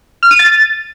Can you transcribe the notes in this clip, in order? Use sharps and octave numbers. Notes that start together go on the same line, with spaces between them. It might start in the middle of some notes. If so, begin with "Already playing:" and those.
F6
D#7
A6